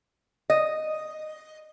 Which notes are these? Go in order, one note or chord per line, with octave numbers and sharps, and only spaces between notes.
D#5